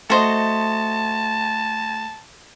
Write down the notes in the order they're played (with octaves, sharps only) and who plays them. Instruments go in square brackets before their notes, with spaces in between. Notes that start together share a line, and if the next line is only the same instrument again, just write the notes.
[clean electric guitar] A3 [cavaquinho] F#4 C5 D#5 [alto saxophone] A5